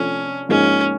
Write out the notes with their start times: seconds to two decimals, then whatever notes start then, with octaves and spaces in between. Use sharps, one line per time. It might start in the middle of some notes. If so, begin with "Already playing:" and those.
Already playing: C3 F3 A3 C#4 D4
0.49 G#2 F3 A#3 C#4 D#4 G#4